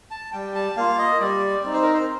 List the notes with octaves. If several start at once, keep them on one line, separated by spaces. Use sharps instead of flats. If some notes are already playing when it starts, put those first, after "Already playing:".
A5
G3 G5
A5
A#3 F4 F5
D#5
G3 D5
C4 D#4 D5
C5
A#4
C5